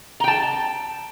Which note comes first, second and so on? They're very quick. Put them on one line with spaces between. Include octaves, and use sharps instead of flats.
A#5 G5 A5